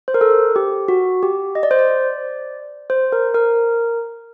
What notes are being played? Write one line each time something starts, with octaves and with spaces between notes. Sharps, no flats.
C5
A#4
A4
G4
F#4
G4
D#5
D5
C5
D5
C5
A#4
A#4